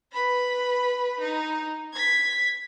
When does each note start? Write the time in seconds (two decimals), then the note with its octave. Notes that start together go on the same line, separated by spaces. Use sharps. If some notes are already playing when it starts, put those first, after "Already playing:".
0.12 B4 B5
1.20 D#4
1.93 G#6 B6